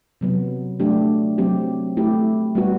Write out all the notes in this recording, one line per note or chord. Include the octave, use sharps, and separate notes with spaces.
C3 F#3 B3
F#3 A3 D4 G4
F#3 C4 G4
A3 E4 G4
G3 B3 F#4